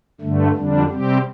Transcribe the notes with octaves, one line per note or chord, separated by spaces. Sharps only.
G2 D3 A3
F2 D3 G3 D4
C3 G3 C4 G4